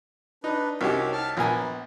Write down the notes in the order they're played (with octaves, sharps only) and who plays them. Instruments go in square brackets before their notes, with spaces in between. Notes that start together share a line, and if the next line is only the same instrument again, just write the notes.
[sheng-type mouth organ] D4 B4 [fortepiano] D#4
[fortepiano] C2 C#4 G4 [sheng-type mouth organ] D#4 F#4 A#4
[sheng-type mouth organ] A5 F6
[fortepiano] A#1 A#4 G#5 [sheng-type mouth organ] B3